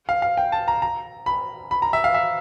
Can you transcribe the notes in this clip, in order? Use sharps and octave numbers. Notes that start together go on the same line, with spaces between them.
F5
F5
G5
A5
A#5
A#5
B5
B5
A#5
E5
F5
E5